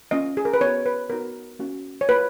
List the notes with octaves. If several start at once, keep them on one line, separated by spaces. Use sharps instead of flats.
A#3 C#4 F4 D#5
G#4
A#4
B4
B3 F#4 C#5
B4
B3 D#4 F#4 A#4
A#3 C#4 F#4
C#5
A#3 F4 B4